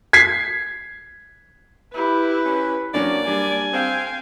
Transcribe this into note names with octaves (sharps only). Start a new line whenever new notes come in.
G#6 B6 C7
E4 G4 B4
C#4
F#3 A#3 C#4 D4 D5
G3 D4 G#5
C4 F5 G5